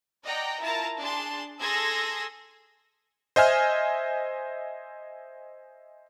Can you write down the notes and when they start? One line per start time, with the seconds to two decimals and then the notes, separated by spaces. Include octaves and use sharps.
0.25 D5 D#5 F#5 G5 A#5
0.61 E4 F4 A#4 A5 A#5
0.99 D4 G#4 A5 C6
1.60 G#4 A4 C6 E6 G#6 A#6
3.36 C5 D#5 E5 G#5 F6